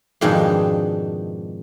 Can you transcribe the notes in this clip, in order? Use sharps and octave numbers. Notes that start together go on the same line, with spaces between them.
F2 G#2 B2 D#3 G#3 D4